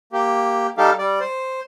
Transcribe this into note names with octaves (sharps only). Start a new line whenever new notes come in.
A#3 G4
G3 D#4 G4 A4 F5
G3 D5
C5